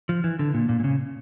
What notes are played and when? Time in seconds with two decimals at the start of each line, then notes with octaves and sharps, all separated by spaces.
0.09 F3
0.24 E3
0.39 D3
0.54 A#2
0.69 A#2
0.80 A#2
0.84 C#3